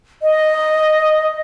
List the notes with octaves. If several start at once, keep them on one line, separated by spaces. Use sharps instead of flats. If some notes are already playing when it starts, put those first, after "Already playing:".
D#5